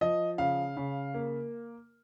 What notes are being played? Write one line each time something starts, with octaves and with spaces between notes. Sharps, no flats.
F3 D#5
C#3 F5
C#3
A#3